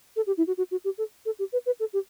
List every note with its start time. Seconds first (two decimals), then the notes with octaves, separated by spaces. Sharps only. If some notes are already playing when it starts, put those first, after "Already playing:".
0.16 A4
0.27 G4
0.38 E4
0.47 F#4
0.58 F#4
0.71 F#4
0.85 G4
0.98 A4
1.26 A4
1.39 G4
1.53 B4
1.66 B4
1.80 A4
1.93 G4